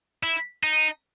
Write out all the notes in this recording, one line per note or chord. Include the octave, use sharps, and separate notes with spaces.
E4
D#4